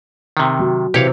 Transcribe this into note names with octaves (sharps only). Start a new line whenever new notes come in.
C3 D#3
F#3
C3 E3 G4 C#5 F5